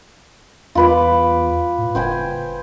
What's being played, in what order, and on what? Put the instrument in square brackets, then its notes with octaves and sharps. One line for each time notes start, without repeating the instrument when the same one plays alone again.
[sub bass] E2 [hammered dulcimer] F4 B4 D6
[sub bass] A2
[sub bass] F#1 [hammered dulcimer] C5 G5 G#5